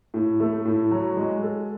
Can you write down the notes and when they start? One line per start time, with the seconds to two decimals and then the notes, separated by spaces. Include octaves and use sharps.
0.14 A2
0.40 A3
0.65 A2
0.91 F#3
1.17 G#3
1.42 A4